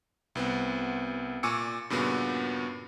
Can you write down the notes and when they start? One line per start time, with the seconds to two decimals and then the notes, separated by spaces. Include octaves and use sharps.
0.35 C2 B3 C4
1.43 A#2 G#5 C#6 D6 E6 C#7
1.90 G2 A#2 C#3 B3 F#4